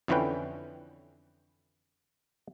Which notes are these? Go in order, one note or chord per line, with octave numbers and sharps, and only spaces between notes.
F2 D3 E3 C#4 B4 G5